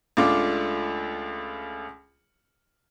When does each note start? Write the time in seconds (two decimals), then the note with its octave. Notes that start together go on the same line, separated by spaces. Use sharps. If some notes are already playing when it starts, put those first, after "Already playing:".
0.17 C#2 A3 D4 F4 D6